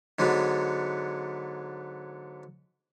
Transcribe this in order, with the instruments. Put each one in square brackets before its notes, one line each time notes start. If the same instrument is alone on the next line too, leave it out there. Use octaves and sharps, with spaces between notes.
[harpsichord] G#2 D3 F#3 B3